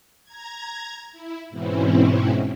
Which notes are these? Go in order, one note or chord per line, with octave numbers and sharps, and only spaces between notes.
A#5 G#6
E4
G#2 B2 E3 C4 C#4 E4